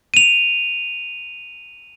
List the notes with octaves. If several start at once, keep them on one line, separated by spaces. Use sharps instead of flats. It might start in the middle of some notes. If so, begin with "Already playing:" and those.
D#7 F7